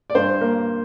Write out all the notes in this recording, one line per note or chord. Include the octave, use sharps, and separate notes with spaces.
D5
G2 C5
A#3